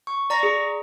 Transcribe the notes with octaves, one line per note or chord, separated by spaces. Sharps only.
C#6
D5 A#5 C#6 A#6
G#4